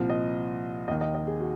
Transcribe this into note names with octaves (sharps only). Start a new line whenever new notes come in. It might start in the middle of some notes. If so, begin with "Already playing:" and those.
Already playing: C2 A#2 F3
D#5
D#2 D#3 D#5
D#5
D#5
G#4
F#4